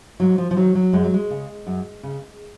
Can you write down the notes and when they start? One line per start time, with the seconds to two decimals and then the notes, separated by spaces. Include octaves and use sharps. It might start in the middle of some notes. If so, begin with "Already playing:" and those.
0.20 G#2 F#3
0.38 F3
0.51 F3
0.56 D#3 F#3
0.75 F#3
0.93 F#2 G#3
1.04 F#3
1.14 G#3
1.30 C#3
1.66 F#2
2.03 C#3